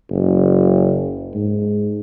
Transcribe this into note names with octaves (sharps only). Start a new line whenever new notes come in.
F#1
G#2